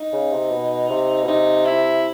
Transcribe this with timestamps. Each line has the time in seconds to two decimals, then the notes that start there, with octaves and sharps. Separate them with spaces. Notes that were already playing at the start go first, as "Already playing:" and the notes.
Already playing: D#4
0.13 C#3
0.32 C3
0.51 B2
0.90 C3
1.24 B2
1.28 C3 D#4
1.66 E4